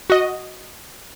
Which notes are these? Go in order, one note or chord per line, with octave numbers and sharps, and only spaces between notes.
F#4 D#5